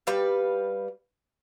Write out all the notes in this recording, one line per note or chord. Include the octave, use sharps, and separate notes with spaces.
G3 B4 F5